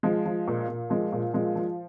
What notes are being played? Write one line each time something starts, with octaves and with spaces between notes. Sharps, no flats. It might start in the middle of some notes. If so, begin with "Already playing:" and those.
F3 G#3
F3
A#2
A#2
F3 G#3
A#2
F3 G#3
F3